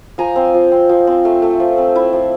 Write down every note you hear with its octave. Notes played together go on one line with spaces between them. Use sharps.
F3 G#5 A#5
C4
F3
C4
F3
C4
A3
A3
F3
C4
E4
F3